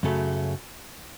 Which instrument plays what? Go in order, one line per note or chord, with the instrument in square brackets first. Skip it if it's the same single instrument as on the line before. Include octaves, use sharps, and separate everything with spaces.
[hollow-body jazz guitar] F#2 C#3 F#3 A3